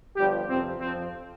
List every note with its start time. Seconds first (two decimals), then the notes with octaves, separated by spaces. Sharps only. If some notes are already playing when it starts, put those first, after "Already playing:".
0.17 G1 G2 F3 G3 G4
0.49 F2 C3 F3 C4
0.81 F2 F3 C4